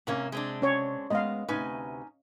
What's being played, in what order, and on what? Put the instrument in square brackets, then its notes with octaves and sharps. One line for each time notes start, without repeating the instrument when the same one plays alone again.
[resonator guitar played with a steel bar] G#2 A#3 C#4 [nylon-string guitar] C3 G#5
[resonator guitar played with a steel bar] G#3 C4 D4
[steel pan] C#4 C#5
[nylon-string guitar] G#3 B3 [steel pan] D#5 F5
[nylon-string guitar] D2 C3 B4 [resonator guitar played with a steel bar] C#4 D#4 G#5